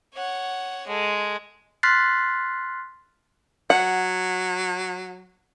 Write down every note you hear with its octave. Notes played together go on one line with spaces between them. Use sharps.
C#5 F#5
G#3 A4
C6 F6 F#6 A6 B6 C7
F#3 F#5